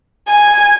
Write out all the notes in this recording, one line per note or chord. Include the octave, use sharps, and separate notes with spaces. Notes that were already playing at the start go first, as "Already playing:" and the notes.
G#5